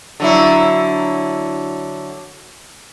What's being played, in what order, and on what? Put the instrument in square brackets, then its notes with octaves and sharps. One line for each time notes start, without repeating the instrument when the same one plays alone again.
[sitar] D3 F#3 E4